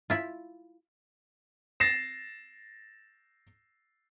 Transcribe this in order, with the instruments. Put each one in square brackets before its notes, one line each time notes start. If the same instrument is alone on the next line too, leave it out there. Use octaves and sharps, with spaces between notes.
[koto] E4 F4
[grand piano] A6 A#6 C7 E7